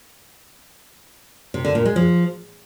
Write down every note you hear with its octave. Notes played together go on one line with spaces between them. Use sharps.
C3
D3
A#2
G#3
F3